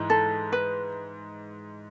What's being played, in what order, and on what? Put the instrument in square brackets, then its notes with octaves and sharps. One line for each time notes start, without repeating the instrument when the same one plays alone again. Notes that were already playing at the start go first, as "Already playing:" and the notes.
Already playing: [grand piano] G#2 E3 G#3
[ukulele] A4
B4